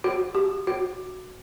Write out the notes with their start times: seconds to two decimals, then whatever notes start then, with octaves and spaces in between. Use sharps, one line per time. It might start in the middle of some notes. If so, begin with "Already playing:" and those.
0.04 F#4
0.35 G4
0.67 F#4